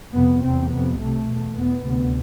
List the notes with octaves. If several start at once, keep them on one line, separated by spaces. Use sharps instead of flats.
F2 C3 B3
E2 C3 C4
F2 C3 B3
C2 C3 A3
E2 B2
E2 B2 B3
D2 C3